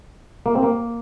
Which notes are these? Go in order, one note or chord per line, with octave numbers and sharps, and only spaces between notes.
A#3
C4
A#3